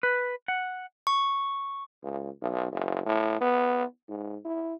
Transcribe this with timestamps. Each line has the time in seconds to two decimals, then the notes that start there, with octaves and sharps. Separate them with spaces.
0.03 B4
0.48 F#5
1.07 C#6
2.03 C#2
2.42 B1
2.72 F#1
3.05 A2
3.41 B3
4.09 G#2
4.45 E4